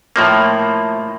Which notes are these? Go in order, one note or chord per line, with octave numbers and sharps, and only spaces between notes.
A2 F3 A#3